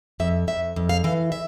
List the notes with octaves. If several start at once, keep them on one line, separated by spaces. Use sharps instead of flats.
F2 E5
F2 E5
F2
F5
E3 F5
E5